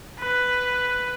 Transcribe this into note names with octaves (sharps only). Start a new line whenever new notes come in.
B4